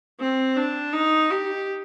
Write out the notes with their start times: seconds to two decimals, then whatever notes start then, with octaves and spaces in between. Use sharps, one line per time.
0.20 C4
0.57 D4
0.93 D#4
1.31 G4